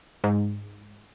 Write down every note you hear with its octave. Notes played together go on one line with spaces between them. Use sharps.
G#2